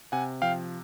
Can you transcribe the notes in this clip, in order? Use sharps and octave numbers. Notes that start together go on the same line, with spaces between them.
C3 F#5 G#5
F3 F5 G5